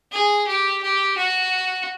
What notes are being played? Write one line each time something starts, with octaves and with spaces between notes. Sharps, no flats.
G#4
G4
G4
F#4